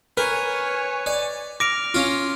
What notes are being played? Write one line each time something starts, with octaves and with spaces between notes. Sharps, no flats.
A#4 B4 C#5 G#5
D5
D6 F6 A#6 D7
C#4 F4